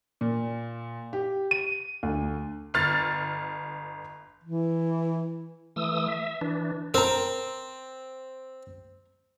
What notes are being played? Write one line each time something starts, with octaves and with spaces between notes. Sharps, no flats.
A#2
G4
D#7
D2
G1 F6 A6
E3
E3 A3 D#6 E6
E5
E3 D4
C4 A#4 A#5